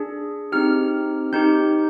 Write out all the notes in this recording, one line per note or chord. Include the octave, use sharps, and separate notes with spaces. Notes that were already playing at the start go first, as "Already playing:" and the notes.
Already playing: D4 G#4
C4 D#4 G4 F6
C4 D#4 G4 G6